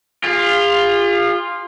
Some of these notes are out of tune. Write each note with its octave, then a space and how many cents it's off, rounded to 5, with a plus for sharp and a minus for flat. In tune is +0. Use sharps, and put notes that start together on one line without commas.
F4 +0 G#4 -40